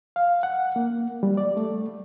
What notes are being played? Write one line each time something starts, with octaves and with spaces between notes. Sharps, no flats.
F5
F#5
A#3
G3
D5
A3